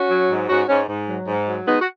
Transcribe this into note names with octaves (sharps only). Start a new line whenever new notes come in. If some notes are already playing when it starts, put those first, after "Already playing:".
Already playing: C#4 F#4
F#3
G#2
G#2 C#4 F#4
G#2 C#4
G#2
F#3
G#2
F#3
G#3 B3 D#4
F#4